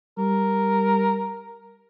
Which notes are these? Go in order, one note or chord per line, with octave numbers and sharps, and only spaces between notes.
G3 A#4